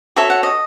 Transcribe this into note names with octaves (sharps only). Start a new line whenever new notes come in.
F#4 A4 C#5 E5
F#5
D#5